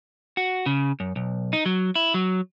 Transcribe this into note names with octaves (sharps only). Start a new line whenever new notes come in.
F#4
C#3
F#2
B1
D#4
F#3
E4
F#3